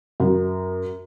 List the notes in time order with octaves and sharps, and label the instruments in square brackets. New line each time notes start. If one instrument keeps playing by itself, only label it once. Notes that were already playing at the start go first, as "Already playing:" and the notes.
[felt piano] F#2